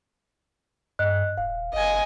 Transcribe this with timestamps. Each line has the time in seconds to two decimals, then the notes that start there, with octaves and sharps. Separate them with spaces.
0.99 G2 D#5 F#6
1.38 D#1 F5
1.73 F#1 D#5 G#5